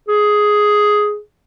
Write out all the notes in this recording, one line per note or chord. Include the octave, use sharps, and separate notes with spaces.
G#4